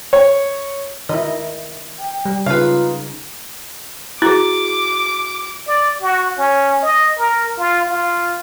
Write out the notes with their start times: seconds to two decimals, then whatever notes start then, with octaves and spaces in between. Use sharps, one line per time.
0.13 C#5
1.09 D#3 E4 D#5
1.99 G5
2.25 G3
2.46 C#3 D#4 F4 B4 F5
4.22 E4 F#4 G#4 D6
5.68 D5
6.02 F#4
6.38 C#4
6.82 D#5
7.18 A#4
7.58 F4
7.88 F4